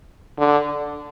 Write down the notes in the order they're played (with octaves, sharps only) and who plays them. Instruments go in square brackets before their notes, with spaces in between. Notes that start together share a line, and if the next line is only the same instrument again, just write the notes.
[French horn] D3